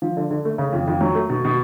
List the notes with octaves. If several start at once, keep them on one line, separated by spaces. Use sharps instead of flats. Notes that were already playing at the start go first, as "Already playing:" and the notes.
F3
D3
D3
A3
C#3
F2
F2
F#3
A3
B2
B2